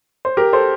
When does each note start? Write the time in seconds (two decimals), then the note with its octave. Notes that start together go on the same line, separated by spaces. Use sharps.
0.25 C5
0.37 G4 A#4
0.53 A4 C5